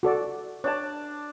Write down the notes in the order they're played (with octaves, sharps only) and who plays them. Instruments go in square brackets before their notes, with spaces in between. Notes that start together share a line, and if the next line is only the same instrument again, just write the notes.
[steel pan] F#4 A4 D5
[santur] D4 D5 A5 [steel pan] C#5